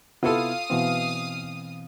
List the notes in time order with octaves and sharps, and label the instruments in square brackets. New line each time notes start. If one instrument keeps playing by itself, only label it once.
[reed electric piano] C3 B3 E4 [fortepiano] F4 A4 [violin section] F5 D#6
[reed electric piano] B2 E3 C4